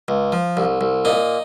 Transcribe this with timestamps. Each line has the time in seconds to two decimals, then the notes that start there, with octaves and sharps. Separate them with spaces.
0.08 C#2
0.32 F3
0.57 C2
0.81 C2
1.05 A#2 D#4